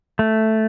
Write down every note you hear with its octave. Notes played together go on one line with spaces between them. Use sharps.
A3